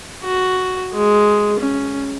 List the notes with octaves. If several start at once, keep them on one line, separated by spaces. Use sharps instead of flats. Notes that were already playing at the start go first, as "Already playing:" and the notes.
F#4
G#3
C#4